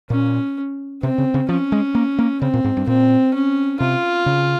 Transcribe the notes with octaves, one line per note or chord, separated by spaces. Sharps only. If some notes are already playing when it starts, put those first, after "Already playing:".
A#2 C#4
C3 C4
C#3
C#3
F3 C#4
G#3
A#3
A#3
C#3 C4
A#2
G#2
G2
A#2 C4
C#4
C3 F4
C#3